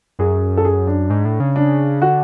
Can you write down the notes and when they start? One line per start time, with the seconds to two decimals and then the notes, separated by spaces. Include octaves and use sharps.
0.19 F#2 G#4
0.57 A4
0.65 G#4
0.87 D4
1.10 G#2
1.25 A2
1.40 C#3
1.56 D4
2.02 D3 F#4